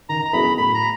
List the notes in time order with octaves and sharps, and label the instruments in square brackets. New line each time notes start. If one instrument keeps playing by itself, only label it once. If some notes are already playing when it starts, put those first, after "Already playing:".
[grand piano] D#3 [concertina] A#5
[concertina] A#5
[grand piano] F#3 B3 E4 G#4 [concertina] B5
[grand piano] A2 [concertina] B5
[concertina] A#5